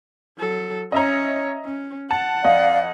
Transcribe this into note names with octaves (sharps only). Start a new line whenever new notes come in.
F#3 A4
C#4 C#5 D#5 E5 A#5
C#4
F#5 A5
F2 D5 D#5 F5